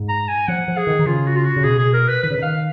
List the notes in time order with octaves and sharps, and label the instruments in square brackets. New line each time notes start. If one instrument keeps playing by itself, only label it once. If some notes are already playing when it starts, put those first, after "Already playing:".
Already playing: [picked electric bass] G#2
[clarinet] A#5
G#5
[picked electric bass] F3 [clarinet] F#5
[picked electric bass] F3
[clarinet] G#4
[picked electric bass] D#3
D#3
[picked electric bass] C#3 [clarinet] F4
[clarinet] F#4
F4
F#4
[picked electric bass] C#3
[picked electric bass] B2 [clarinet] G#4
[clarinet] G#4
A#4
B4
[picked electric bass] D#3 [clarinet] B4
[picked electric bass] C#3
D#3
[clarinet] F5